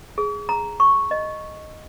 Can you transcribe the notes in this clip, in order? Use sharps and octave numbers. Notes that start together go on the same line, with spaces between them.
G#4
A#5
C#6
D#5